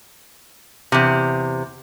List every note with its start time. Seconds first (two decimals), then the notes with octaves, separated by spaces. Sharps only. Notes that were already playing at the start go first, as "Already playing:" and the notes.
0.92 E2 C3